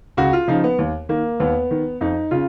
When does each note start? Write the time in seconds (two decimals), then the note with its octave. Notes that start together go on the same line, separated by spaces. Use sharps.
0.17 C#2 F#4
0.33 F4
0.48 C#3 F3 D#4
0.64 B3
0.79 D#2
1.09 D#3 A#3
1.40 D#2 B3
1.71 D#3
2.01 F2 D#4
2.31 C#3 F4